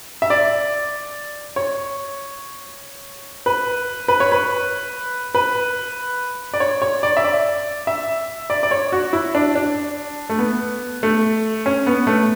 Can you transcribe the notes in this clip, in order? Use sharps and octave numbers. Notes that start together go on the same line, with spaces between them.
E5
D5
C#5
B4
B4
C#5
B4
B4
D5
C#5
C#5
D5
E5
D5
E5
D5
D5
C#5
F#4
E4
D4
D4
A3
B3
A3
C#4
B3
A3